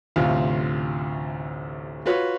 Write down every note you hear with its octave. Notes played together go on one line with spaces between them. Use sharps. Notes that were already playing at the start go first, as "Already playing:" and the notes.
A1 D2 C3 F4 F5
F4 F#4 B4 C#5